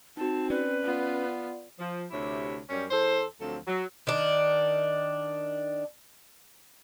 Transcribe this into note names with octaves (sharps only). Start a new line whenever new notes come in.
C4 D#4 F#4 A5
C#4 B4 D5
B3 F4
F3
D2 C3 E4 G4 C#5
F#2 G3 C#4
E2 A4 C5
D2 F3 F#3 C4 A4
F#3
D#3 D4